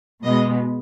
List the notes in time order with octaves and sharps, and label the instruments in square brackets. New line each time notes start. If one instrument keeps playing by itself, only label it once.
[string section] B2 G#3 B3 D#5